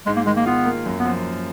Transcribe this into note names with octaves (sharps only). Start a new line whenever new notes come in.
G#2 G#3
A#3
D#3 G#3
A#3
B3 F4
A#3
F#2
B3
F3